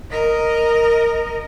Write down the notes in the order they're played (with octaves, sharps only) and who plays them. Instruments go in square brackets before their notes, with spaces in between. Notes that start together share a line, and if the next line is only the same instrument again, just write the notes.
[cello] A#4 D#5